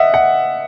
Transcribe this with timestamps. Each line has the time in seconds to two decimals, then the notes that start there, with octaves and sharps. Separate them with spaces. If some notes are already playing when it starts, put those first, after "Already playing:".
Already playing: D#5 E5 F#5
0.14 F#5